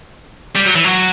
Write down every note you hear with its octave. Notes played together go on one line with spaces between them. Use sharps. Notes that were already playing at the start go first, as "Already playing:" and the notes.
G3
F#3
E3
F#3